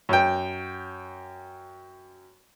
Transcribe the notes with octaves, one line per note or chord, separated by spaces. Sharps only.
F#2 G5